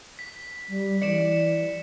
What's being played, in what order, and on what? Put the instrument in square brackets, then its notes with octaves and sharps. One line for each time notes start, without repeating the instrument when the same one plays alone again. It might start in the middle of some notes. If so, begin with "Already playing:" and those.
[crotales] B6
[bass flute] G3
[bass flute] E3 [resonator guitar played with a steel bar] D5 [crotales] C#7 E7